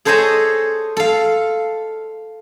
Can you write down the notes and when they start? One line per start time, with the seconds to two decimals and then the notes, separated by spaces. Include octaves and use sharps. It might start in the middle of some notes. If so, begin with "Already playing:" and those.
0.05 G#4 A4 C5 C#5 D#5 A5
0.97 A4 F5